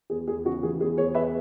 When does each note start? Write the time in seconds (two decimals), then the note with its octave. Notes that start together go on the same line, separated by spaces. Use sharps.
0.10 E2 G#4
0.27 E2 G#4
0.45 C#3 F#4
0.63 E3 G#4
0.81 E2 G#4
0.97 E2 G#4 C#5
1.14 E2 B4 E5